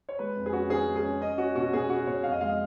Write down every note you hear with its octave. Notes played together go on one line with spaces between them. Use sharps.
C#5
G#3 B4
F2
G#4
C#4 F#4
C#4 G#4
G#3
G#4
C#4
C#4 D#5
C#4 F#4
B2 F#4
B2 G#4
C#4 F#4
B2 C#5
F2 F5
D#5
G#3 F5
D#5